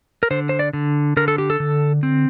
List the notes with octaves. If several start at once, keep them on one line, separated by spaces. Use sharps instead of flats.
A#4
D3 C5
C5
D5
D3
D3 A#4
A4
G4
A4
D3
C4